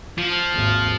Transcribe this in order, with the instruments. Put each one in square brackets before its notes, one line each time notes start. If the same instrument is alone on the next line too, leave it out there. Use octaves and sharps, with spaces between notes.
[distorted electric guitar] F3
[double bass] G#1 D#2